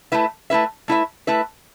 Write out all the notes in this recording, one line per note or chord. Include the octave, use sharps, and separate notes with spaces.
A3 E4 B4 E5
A3 E4 B4 E5
A3 E4 B4 E5
A3 E4 B4 E5